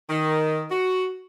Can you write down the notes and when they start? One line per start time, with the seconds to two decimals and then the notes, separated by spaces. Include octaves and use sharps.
0.09 D#3
0.69 F#4